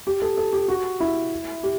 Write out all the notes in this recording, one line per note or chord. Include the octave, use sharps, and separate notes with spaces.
G4
A4
A4
G4
F#4
E4
G4